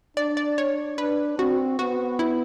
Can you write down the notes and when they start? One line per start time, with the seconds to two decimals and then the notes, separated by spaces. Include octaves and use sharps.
0.17 D4 D5
0.37 D5
0.58 C#5
0.98 D4 B4
1.38 C4 F#4
1.79 B3 F#4
2.19 E4